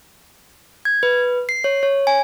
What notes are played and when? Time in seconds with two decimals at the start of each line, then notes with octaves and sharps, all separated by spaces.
0.85 G#6
1.03 B4
1.49 C7
1.64 C#5
1.83 C#5
2.07 G#5